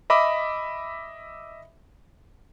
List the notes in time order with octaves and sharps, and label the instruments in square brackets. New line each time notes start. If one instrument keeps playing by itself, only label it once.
[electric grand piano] D#5 E5 B5 D6